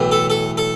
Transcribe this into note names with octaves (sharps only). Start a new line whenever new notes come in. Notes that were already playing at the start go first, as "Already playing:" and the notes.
Already playing: B1 A2 E3
A4
A4
A4